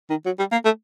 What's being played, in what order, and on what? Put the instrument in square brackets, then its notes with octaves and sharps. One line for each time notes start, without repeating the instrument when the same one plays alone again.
[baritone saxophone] D#3
F#3
G3
A#3
A3